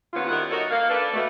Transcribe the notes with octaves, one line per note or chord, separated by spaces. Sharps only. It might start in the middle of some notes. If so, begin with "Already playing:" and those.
C3 D#3 A#3 B3 C#4 F4
D#3 G3 E4 A#4 F#5
D#4 F#4 A4 A#4 C#5 D#5
A#3 F5
D4 A4 B4
B2 A3